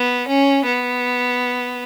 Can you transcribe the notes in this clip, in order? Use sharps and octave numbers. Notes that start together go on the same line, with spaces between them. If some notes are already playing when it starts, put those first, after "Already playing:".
Already playing: B3
C#4
B3